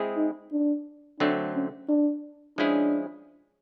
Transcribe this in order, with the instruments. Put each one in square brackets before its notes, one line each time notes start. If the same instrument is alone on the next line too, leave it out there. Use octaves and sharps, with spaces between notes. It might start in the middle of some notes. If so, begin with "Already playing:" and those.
Already playing: [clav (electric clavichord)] G#3 C4 E4 G#4
[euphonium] D#4
D4
[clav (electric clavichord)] D3 F#3 A3 C4 [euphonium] D4
[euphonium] C#4
D4
[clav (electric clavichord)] F3 G#3 C#4 E4 G#4 [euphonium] D4